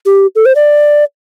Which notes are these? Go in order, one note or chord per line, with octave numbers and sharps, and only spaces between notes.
G4
A4
C5
D5